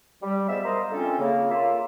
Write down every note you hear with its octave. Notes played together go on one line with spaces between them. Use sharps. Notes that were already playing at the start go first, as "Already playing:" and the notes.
G3
F3 G#3 B3 D5 E5
A#4 C5 D#5 F5
D3 A3 C4 C#4 F4 A4
C#3 A#3
A#3 F4 E5